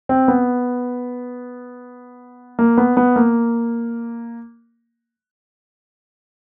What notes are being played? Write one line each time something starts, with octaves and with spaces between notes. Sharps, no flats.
C4
B3
A#3
B3
B3
A#3